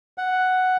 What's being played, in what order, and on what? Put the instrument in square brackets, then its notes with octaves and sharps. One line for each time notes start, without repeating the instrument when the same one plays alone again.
[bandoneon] F#5